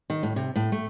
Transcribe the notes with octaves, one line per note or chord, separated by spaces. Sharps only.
D#3
A2
C3
A2
A3